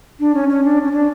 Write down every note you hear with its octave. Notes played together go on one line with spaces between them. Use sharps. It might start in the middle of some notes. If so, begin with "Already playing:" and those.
D4
C#4
C#4
D4
C#4
D4